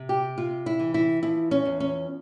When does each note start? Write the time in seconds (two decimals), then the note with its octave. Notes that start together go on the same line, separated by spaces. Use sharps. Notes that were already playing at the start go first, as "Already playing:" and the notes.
Already playing: C3
0.09 G4
0.38 C3 F4
0.66 E4
0.79 E3
0.94 E4
1.23 F3 E4
1.51 C#4
1.66 E2
1.80 C#4